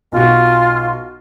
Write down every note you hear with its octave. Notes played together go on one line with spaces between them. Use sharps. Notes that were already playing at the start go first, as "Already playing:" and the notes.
B1 F4 F#4